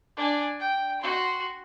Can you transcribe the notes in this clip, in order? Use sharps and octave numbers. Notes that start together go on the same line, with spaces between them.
D4 G#5
G5
F#4 C6